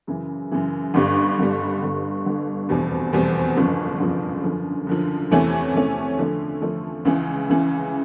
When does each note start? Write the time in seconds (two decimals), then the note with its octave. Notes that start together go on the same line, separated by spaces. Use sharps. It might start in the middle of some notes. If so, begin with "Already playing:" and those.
0.07 F#2 C#3 E3
0.51 F#2 C#3 E3
0.94 G1 G2 D3 G3
1.38 G1 G2 D3 G3
1.81 G1 G2 D3
2.26 G1 G2 D3
2.69 F1 E2 B2 G3 C4
3.13 F1 E2 B2 G3 C4
3.57 G1 F#2 C#3 F3
3.99 G1 F#2 C#3 F3
4.43 F#2 D3 F3
4.87 F#2 D3 F3
5.31 E2 C3 E3 A3 C#4
5.74 E2 C3 E3 A3 C#4
6.19 D3 F3 A3
6.62 D3 F3 A3
7.05 C#2 C#3 E3
7.49 C#2 C#3 E3